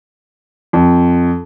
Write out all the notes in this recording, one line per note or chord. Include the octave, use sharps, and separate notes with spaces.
F2